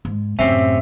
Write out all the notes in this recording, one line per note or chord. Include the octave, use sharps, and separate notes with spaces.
G#2
F#2 A2 C3 C4 C#4 E5